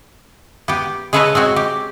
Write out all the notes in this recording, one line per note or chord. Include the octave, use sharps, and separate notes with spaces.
B3 G4
G#3 G#4 A4 B4 C#5 A#5
G#3 C4 F#4 C#5
G4